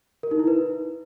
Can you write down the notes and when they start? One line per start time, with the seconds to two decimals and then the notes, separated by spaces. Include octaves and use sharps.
0.23 A#4
0.31 D#4
0.39 E4
0.47 B4